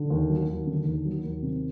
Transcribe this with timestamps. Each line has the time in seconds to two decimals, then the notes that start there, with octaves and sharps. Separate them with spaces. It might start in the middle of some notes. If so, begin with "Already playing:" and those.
Already playing: D3
0.10 D#2
0.29 F#3
0.48 D#2
0.67 D3
0.85 D#2
1.05 F#3
1.24 D#2
1.42 C3